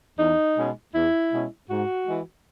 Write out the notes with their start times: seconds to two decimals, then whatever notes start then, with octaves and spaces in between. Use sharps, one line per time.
0.19 E2 D#4
0.57 B2 G#3 C#4
0.94 E2 E4
1.31 B2 G#3 C#4
1.69 G#2 F#4
2.06 E3 G#3